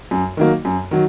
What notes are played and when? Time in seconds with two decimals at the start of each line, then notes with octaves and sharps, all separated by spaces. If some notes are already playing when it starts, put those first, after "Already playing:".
0.11 F#2
0.37 D#3 F#3 A#3
0.65 F#2
0.91 D#3 F#3